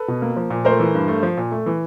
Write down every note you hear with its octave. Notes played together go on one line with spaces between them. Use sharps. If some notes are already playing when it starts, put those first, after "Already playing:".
Already playing: A4 B4
B2
A#3
F3
A#2
A3 A#4 C5
E3
G2
A3
F3
A#2
A3
E3